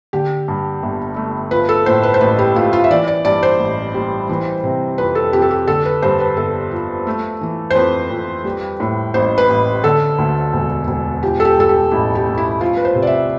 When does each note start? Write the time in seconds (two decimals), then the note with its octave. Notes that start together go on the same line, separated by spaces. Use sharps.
0.13 D3 G4
0.48 G2
0.83 G1
1.16 A3
1.51 F3 B4
1.69 A4
1.86 A2 C5
2.03 B4
2.14 C5
2.21 A1 B4
2.39 G4
2.56 A3 F4
2.73 F4
2.84 E5
2.91 E3 D5
3.08 D5
3.25 G2 D5
3.43 C5
3.59 A1
3.94 G3
4.29 E3
4.63 C3
4.98 F2 B4
5.15 A4
5.33 F2 G4
5.42 A4
5.51 G4
5.68 D3 A4
5.85 B4
6.02 G2 C5
6.20 B4
6.37 G1 A4
6.71 F3
7.07 A3
7.41 E3
7.70 C5
7.75 F2 B4
8.10 F2
8.44 G3
8.80 A2
9.14 A1 C5
9.38 B4
9.49 A1
9.84 D3 A4
10.18 D2
10.53 E1
10.87 E1
11.23 F3 G4
11.40 A4
11.45 G4
11.57 G2 A4
11.69 G4
11.91 A1 E4
12.15 G4
12.26 A3
12.38 E4
12.61 F3 F4
12.77 B4
12.85 C5
12.95 C3
13.02 D5
13.07 E5